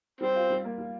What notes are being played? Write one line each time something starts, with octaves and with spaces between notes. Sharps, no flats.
G3 C4
F4
G3
A#3
G3